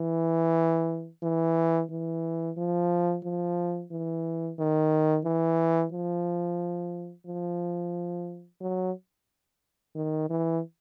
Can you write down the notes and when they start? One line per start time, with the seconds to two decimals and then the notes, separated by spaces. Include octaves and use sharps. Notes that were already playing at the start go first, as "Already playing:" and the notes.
Already playing: E3
1.23 E3
1.90 E3
2.57 F3
3.24 F3
3.91 E3
4.59 D#3
5.25 E3
5.92 F3
7.27 F3
8.61 F#3
9.95 D#3
10.30 E3